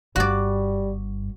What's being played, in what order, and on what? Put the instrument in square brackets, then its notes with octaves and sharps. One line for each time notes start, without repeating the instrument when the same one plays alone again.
[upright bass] G1 G2 [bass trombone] G3 [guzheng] F#4 D5